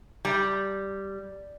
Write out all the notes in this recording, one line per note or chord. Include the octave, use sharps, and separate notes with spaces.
G3